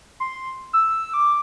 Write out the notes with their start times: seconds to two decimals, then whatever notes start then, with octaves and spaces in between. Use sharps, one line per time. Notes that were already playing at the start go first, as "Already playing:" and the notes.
0.20 C6
0.73 E6
1.14 D6